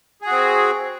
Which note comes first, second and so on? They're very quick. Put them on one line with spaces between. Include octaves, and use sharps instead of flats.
G#4 F#4 C4